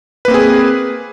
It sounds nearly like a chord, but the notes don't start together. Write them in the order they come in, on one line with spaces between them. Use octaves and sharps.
B4 A#3 C4 G#4